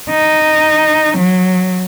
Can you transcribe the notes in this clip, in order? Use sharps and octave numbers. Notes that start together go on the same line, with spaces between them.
D#4
F#3